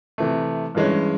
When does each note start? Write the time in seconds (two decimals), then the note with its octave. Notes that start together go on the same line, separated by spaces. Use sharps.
0.18 C3 E3 A3
0.75 G2 E3 G#3 C#4